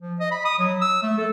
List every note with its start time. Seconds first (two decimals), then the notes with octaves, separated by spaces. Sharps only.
0.02 F3
0.20 D#5
0.32 B5
0.45 D#6
0.59 F#3
0.81 E6
1.03 A3
1.18 A4